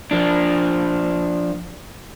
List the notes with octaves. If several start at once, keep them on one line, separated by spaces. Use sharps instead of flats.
F3 D4